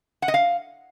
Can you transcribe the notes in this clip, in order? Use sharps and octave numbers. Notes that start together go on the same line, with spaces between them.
F#5
D#5
F5